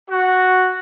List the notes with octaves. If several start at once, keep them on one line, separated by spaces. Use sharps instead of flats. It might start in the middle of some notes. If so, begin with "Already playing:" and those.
F#4